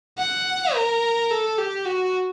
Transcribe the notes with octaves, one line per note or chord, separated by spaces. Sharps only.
F#5
A#4
A4
G4
F#4